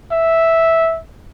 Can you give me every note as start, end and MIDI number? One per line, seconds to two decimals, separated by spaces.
0.12 0.98 76